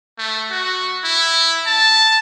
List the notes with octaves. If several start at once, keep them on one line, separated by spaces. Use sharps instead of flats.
A3
F#4
E4
A5